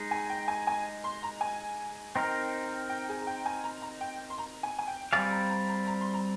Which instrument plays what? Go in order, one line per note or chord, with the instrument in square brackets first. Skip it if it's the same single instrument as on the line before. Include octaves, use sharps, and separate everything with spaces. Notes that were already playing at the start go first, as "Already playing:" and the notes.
Already playing: [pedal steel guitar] G#3 D#4 G#4
[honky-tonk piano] G#5
G5
G#5
G#5
C6
A#5
G#5
[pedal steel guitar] C4 D#4 A#4 [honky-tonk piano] G5
[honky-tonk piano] G5
G#4
G5
G#5
A#5
A#5
G5
C6
A#5
G#5
G#5
G5
[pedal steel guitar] G3 C4 G4 D5 F5 [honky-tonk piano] G#5
[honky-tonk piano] A#5
A#5
A#5
A#5
C6
A#5